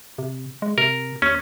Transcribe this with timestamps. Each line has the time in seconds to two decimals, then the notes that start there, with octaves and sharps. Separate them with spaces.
0.18 C3
0.62 G#3
0.78 C3 A#4
1.22 D#2 C#4